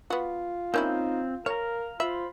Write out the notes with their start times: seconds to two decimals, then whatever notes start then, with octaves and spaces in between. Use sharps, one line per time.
0.10 B3 F4 F#4
0.74 A#3 C4 C#4 D#4 E4 G6
1.46 A#4 C#5 F5 A#5
2.00 F4 C5 E5 B5